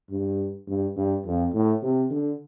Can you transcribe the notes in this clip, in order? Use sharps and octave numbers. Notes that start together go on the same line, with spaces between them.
G2
G2
G2
F2
A2
C3
D3